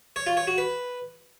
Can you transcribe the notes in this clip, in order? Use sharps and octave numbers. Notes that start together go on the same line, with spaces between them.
C#5
F4
C#5
F#4
B4